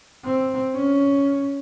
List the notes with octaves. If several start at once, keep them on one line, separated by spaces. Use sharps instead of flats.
C4
C#4